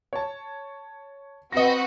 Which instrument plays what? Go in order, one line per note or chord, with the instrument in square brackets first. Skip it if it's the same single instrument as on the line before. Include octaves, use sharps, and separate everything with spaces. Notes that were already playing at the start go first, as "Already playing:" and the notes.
[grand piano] C#5 A5
[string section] C4 F#4 B4 [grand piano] D#5 A#6